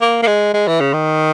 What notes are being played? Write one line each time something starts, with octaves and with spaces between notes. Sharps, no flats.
A#3
A#3
G#3
G#3
E3
C#3
D#3